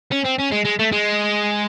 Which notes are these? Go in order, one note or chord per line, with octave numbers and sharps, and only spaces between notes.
C#4
C4
C#4
G#3
G#3
A3
G#3